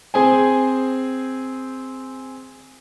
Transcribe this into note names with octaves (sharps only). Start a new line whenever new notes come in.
C4 G#4 C5 G#5